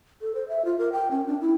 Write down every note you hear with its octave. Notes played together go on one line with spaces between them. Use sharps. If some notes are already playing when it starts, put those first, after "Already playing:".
A4
C5
E5
F4
A#4
G5
C#4
D4
E4